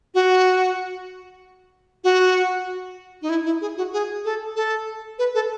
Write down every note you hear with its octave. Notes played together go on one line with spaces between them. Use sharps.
F#4
F#4
D#4
E4
E4
G#4
F#4
G#4
A4
A4
B4
A4